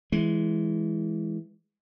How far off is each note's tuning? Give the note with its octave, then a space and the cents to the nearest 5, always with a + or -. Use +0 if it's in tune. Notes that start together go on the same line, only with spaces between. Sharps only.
E3 +0 G#3 +5